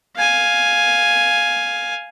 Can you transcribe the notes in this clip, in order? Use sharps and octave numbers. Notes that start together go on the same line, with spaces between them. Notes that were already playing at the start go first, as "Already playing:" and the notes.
F5 G#5